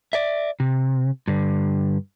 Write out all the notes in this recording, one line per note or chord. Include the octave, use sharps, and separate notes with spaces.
D5 E5
C3
G2 D3